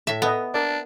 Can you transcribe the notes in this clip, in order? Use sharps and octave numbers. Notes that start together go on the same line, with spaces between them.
A2 E5
B3 A4 B4 D#5
D4 A#4 D5